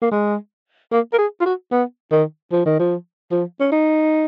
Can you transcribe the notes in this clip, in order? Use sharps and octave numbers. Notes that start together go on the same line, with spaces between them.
A#3
G#3
A#3
A#4
G#4
F4
F#4
B3
D#3
F3
D#3
F3
F3
C#4
D#4